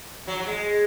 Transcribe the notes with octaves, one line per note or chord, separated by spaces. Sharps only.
F#3
F#3
G#3